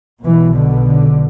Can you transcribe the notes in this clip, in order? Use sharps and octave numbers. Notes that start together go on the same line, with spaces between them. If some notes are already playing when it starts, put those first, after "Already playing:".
B1 B2 E3
D3
D3